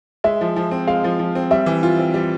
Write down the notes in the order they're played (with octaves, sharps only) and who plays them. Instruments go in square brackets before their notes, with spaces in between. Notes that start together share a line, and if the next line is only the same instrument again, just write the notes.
[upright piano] G#3 [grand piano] E5
[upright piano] F3
F3
C4
[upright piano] G#3 [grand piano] F5
[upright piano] F3
F3
C4
[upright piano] G3 [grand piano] E5
[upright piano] E3
F4
C4
G3